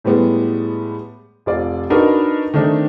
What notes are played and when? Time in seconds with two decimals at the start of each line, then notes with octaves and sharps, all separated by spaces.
0.04 A2 G3 G#3 B3
1.46 F1 F4 D5
1.90 D4 D#4 F#4 A#4 B4 D#5
2.54 D#3 A3 C4 D4 D#4